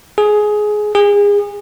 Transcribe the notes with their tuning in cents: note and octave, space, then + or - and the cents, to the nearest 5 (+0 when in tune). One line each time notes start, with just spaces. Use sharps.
G#4 +15
G#4 -30